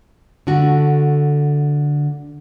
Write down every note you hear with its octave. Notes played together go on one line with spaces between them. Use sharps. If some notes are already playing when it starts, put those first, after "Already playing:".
D3 A3 F#4